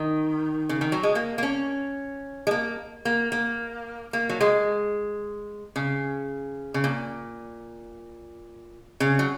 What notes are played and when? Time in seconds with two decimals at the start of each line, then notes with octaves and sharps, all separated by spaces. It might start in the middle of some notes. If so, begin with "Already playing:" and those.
Already playing: D#3
0.69 C#3
0.81 D#3
0.92 F#3
1.03 G#3
1.15 A#3
1.38 A#3
1.43 C#4
2.47 G#3
2.51 A#3
3.05 A#3
3.32 A#3
4.13 A#3
4.29 F#3
4.41 G#3
5.76 C#3
6.74 C#3
6.84 A#2
9.00 C#3
9.19 F#3